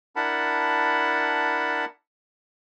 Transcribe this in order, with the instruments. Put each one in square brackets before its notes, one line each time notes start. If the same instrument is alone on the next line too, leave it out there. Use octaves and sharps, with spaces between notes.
[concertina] D4 E4 A#4 F#5 A5 B5